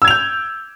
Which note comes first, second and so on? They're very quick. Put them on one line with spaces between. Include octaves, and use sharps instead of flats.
E6 G#6 F7 G6